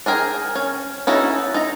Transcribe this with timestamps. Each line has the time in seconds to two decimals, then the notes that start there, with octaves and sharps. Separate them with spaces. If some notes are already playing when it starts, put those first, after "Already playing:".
0.06 D4 G#4 A#4 G5 G#5
0.55 C#4
1.07 C#4 D#4 E4 F#4 A4
1.54 D#4 A#5